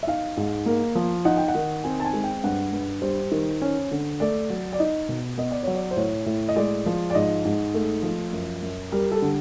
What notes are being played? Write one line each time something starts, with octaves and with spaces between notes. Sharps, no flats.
E5
D#4 F5
G#2
A#3
F3
D#4 F#5
G5
F#5
D#3
C4 G#5
A5
G#5
G#3
G5
G2 F#5
G2
G3 C5
D#3
C#4
D3
A3 D5
F#3
D5
D#4 D#5
B2
B3 D#5
D5
F#3 C#5
D5
C5
A2 C#5
A2
D#5
G#3 D5
F3
D5
G#2 D#5
G#2
A3
F3
F#2
F#2
G3 A#4
A4
D3